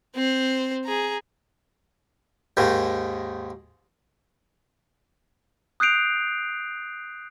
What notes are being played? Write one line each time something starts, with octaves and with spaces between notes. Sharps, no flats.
C4 C5
G#4 A#5
D#2 G#2 D#3
D#6 F#6 G6 C7 D7 F7